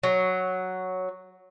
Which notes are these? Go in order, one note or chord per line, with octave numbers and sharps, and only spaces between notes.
F#3